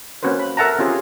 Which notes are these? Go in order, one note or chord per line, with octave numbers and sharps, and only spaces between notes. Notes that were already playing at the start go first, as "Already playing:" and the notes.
A#3 C4 C#4 F#4 B4 C5
B5
A4 A#4 E5 F#5 A5 A#5
C4 C#4 F4 G4 G#4